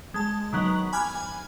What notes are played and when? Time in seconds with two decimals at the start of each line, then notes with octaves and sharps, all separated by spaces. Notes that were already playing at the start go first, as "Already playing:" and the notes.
0.14 G#3 A5
0.53 D#3 F#3 B3 F#7
0.93 G#5 B5 D6 F6 F#6 G#6
1.15 G#5